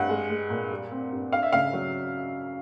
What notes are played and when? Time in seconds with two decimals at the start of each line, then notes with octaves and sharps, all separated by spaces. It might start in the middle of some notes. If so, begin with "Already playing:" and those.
Already playing: G2 F#5
0.09 G#3
0.30 G#3
0.50 A#2
0.71 G3
0.91 C4
1.12 G2
1.32 D4 F5
1.43 E5
1.52 C#3 F5
1.73 F#3